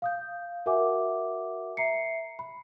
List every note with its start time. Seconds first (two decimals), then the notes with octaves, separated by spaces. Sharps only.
0.02 F5 D#6 G6
0.66 F#4 A#4 E5 F#5 G#5 D6
1.77 E5 A#5 C7 C#7
2.39 B5